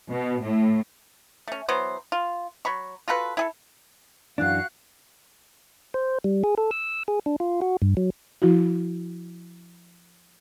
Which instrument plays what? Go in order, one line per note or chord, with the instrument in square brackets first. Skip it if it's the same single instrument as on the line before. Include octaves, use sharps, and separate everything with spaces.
[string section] B2
A2
[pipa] A3 C#4
E3 F#3 B3 C5
F4
F#3 B5 C#6
F4 F#4 A4 B4
E4 G#4 A4
[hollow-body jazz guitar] F#2 E3 D4 [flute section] F#4 F5 F#6
[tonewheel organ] C5
G3
G#4
A4
E6
G#4
D4
F4
F#4
G2
F#3
[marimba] F3 E4 F#4